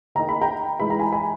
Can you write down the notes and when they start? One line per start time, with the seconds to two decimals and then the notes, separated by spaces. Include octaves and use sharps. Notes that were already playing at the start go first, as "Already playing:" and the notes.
0.15 D#3 A#3 D#4 A#5
0.29 B5
0.41 G5 A#5
0.80 E3 G#3 D#4 B5
0.90 A#5
0.99 G#5 B5
1.12 G#5 B5